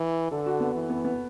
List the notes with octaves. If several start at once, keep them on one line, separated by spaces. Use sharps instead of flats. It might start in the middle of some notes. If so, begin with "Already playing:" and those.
Already playing: E3
D3 A4
F#4
B3
E3
B3
B3